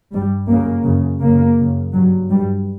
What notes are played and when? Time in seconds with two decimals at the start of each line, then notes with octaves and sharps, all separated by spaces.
0.12 G2 G3
0.48 F#2 C#3 A#3
0.85 F#2 C#3
1.21 F#2 C#3 A#3
1.58 F#2 C#3
1.93 G2 F#3
2.30 G2 G3